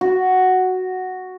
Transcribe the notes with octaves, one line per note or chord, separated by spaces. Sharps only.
F#4